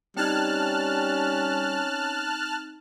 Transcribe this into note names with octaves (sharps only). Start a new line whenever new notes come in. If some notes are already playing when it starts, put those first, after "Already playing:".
G3 C4 C#4 D#4 A5 F6 F#6